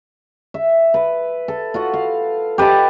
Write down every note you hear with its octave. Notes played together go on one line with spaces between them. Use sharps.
E5
B4
A4
F4 F#4 F#5
F5
G4 B4 D#5 A5